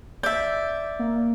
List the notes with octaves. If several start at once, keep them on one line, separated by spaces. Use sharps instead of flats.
D5 E5 G6
A#3